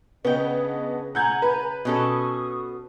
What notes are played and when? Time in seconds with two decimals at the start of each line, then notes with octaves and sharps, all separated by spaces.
0.25 C#3 B3 D4 G#4 D#5 G5
1.15 F#5 G#5 A#5 G6 G#6
1.42 B4
1.85 B2 C#4 A4 C#6 D#6